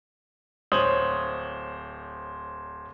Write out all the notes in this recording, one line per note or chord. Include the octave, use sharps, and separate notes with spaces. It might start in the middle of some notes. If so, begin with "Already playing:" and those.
D1 C5 C#5 D#6 F#7